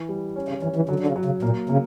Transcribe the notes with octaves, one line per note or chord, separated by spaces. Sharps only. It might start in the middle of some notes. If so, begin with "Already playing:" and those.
Already playing: E3
G3
C#4
C#3
E3 C#4
E3
D3 F#3
D3
C#3
F#3
C#3
A#2 A#3
C#3 A#3